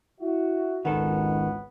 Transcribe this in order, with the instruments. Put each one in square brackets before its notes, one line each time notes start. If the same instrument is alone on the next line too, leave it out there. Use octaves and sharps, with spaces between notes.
[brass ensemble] E4 F#4 E5
[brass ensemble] G#1 C#2 [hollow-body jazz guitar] D#3 A4 [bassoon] B3